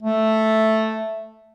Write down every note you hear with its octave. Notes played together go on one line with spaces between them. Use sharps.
A3